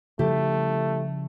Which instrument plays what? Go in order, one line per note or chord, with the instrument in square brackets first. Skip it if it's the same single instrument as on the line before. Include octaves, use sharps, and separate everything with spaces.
[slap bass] C#3 F3 G3 [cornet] A3 [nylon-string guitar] E4 G4 A4